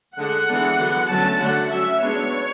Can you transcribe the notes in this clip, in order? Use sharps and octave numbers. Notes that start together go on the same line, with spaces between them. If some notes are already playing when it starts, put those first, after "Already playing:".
D3 G#3 D4 F#5
E3 G#3 B3 D4
D3 F#3 B3
D3 F#3 A3 C#4 A5
D3 F#3 A3 D4 F#5
F#3 C#4 E5
G#3 B3 D4 C#5